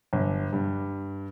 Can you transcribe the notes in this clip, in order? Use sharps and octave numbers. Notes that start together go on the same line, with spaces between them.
G1
G2